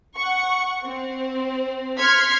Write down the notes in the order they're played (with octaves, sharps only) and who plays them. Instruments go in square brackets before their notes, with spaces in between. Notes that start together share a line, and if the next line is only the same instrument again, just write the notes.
[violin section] F#5 C#6
C4
C6 F6 G#6 B6 C#7